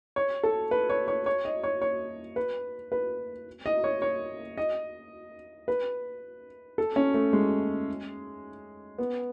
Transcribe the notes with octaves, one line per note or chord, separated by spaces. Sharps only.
C#5
A4
B4
C#5
C#5
C#5
D#5
C#5
C#5
B4
B4
D#5
C#5
C#5
D#5
B4
A4
C#4
A3
G#3
B3